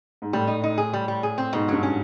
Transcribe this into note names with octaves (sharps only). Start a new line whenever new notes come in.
G#2
A2 G3
D#4
D#4
G#4
G3
G3
G#4
C4
G#2 B2
G2 F#3
C#4